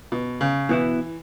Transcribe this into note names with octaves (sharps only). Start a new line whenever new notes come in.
B2
C#3
B2 E3 B3 E4